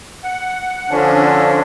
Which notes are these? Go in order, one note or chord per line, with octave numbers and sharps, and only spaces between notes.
F#5
D3 F3 C#4 D4